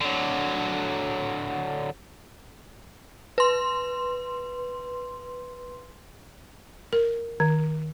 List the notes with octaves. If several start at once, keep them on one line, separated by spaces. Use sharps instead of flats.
D3 F#3
B4 C6
A#4
D#3